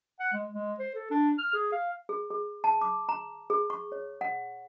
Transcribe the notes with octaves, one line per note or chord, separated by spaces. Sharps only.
F#5
G#3
G#3
C5
A4
D4
F6
G#4
F5
G#4
G#4
A5
D6
A#5
G#4
C#6
C#5
F#5